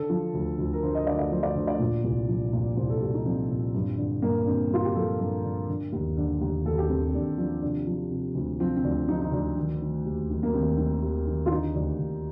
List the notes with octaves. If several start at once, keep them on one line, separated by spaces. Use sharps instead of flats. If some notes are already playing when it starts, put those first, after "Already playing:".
Already playing: D3 A4
F3
D2
D2
A#4
D3 C5
D#5
D3 D5
D5
F3 C5
D5
D3 C5
D5
A#2
C2
F3
A#2
C2 C5
A4
A#2 G4
D#4
F3 C4
A#2
G2
D3
G2 A#3
D3 C4
G2 F4
G4
F3 A4
G2 A#4
D3
D3
D#2
D3
D#2
D#2 A4
G4
D#2 C4
C4
D#2 D4
F3 D4
C3 D4
F3
C3
D2
F3 C4
C4
D2 D4
F3 D#4
D#4
D2 D4
D#3
D#3
D#2
D#3
A#3
D#2 C4
D#3
D#2
D#3
F4
D3 D#4
D2 D4
D2